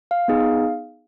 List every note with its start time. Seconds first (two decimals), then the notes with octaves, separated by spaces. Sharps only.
0.11 F5
0.28 B3 D#4 G#4